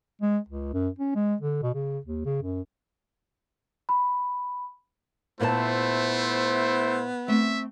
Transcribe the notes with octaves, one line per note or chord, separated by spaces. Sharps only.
G#3
C#2
F#2
C#4
G#3
D3
B2
C#3
D#2
C#3
F#2
B5
A#2 A3 B3 E4 B4 C5 A5
A3 C4 E5